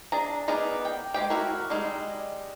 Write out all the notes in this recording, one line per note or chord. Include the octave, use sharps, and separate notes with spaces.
D4 G#4 A#5
B3 D#4 G#4 A#4 D5
G5
G#3 A3 G4 G5
E4 F#4 A#4
G3 G#3 D#4